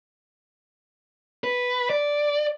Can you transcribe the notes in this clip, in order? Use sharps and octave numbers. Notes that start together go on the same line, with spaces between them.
B4
D5